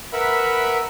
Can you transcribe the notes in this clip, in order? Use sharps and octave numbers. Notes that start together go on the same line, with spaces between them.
A#4 B4 E5 F#5 B5